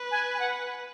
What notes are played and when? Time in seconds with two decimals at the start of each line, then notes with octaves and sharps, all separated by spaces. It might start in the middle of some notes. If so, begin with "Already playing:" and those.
Already playing: B4
0.11 G#5
0.35 G#5
0.40 F#5